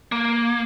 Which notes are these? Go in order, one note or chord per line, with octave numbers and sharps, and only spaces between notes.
A#3